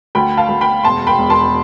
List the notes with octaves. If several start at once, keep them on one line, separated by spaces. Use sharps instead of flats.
D2 G5 B5
F5 A5
D2
G5 B5
E1 A5 C6
G5 B5
E1
A5 C6